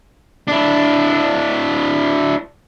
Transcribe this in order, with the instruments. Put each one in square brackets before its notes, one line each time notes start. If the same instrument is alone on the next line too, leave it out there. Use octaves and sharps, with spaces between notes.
[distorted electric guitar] D4 E4